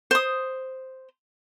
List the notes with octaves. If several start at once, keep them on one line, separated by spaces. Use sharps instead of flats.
C5 D#6